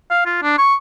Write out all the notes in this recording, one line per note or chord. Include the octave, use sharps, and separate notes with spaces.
F5
F4
D4
C#6